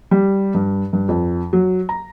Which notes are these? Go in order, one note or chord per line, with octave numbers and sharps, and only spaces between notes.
G3
G2
G2
F2
F#3
A#5